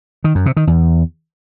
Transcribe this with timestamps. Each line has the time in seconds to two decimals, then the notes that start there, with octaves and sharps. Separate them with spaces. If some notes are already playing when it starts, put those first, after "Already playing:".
0.24 D#3
0.35 F#2
0.46 C3
0.57 D#3
0.67 E2